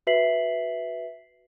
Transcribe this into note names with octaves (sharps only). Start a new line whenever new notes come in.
F#4 B4 E5 B6 C7 F#7